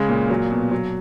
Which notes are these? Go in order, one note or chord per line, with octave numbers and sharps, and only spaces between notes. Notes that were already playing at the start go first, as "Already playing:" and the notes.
Already playing: C#3 G#3
A#2
F#3
B2
F#3